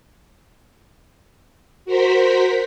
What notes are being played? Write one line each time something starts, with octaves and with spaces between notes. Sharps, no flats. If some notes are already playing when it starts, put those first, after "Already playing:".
F#4 A#4 C5 B6